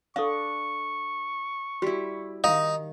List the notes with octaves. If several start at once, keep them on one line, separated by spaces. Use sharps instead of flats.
D4 A4 F5 C#6
G3 E4 F#4
D#3 D#4 F5